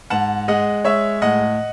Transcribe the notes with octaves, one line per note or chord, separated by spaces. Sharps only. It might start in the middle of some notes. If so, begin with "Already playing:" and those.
G#2 F#5 A5
G#3 D#5 F#5
G#3 C#5 E5
A2 D#5 F#5